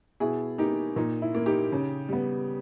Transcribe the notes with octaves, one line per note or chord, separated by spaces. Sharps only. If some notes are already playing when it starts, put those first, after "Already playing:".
B2 E4 G#4
A#3 D#4 G4
A#2 D#4
E4
A#3
D#4 G4
C#3
G3 B3